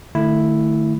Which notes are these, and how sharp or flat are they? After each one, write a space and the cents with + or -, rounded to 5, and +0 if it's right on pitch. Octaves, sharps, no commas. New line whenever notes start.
D#3 -45 A3 +0 E4 +0